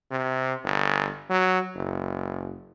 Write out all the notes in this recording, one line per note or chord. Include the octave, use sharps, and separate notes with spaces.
C3
G1
F#3
F#1